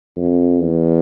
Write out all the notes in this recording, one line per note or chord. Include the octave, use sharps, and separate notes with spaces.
F2
E2